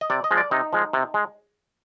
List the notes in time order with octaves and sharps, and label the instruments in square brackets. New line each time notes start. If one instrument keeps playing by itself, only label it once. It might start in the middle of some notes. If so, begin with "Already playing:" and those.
[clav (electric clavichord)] D#5
C3 D5
D#5
F3 G#3
D5
C3 D#4
F3 G#3
C3
G#3